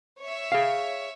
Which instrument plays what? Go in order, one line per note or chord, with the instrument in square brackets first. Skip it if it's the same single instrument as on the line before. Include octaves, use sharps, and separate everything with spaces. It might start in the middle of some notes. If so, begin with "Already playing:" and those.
[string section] C#5 E5
[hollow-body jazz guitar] G#4 F5